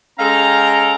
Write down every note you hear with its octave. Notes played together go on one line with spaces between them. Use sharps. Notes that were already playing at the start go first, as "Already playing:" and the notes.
G#3 C#4 A4 F5 G5 A#5